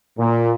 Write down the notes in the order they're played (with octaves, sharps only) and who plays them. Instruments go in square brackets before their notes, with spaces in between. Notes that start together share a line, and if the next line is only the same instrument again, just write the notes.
[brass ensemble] A#2